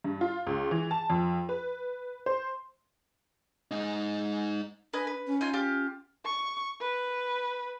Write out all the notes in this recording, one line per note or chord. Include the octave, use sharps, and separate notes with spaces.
G2
F4
C#2
E3
A5
F2
B4
C5
G#2 D#4
D4 B4 D#5 G#5
B4
C#4
D#4 F4 G#5
F4 G4
C#6
B4